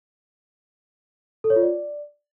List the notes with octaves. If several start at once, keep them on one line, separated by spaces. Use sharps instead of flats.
A4
C#5
F4
D5